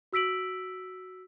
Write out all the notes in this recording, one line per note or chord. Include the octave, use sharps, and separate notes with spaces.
F#4 E6 B6 D7 F#7